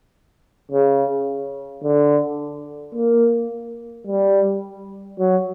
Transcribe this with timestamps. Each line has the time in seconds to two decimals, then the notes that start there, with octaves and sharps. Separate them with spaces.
0.71 C#3
1.84 D3
2.95 A#3
4.07 G3
5.19 F#3